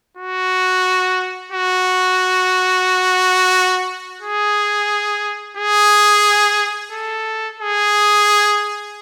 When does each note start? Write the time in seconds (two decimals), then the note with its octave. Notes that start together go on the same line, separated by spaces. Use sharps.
0.17 F#4
1.52 F#4
4.22 G#4
5.57 G#4
6.92 A4
7.60 G#4